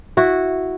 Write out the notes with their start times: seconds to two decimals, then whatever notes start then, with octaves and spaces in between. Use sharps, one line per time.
0.17 E4 F#4